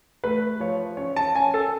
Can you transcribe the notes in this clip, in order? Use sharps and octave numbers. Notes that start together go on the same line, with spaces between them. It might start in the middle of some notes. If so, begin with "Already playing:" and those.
A3 B4
F3 C#5
C#4 C#5
A5
C#4 G#5
A4